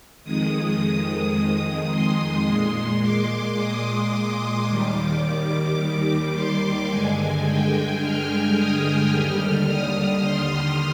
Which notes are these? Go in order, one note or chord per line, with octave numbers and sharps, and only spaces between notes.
F2 D#3 G#3 D#6
C6
A#2 G#3 C6
D6
D#6
D#6
D#2 D#3 G3 D6
C6
G2 D3 G#3 G#5
G5
F6
D#6
D#2 D3 G3 F6
D#6
C6